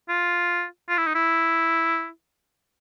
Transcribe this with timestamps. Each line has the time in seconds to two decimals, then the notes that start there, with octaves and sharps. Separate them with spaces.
0.09 F4
0.89 F4
0.98 E4
1.07 D#4
1.15 E4